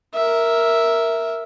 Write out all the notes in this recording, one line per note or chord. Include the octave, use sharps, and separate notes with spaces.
A#4 E5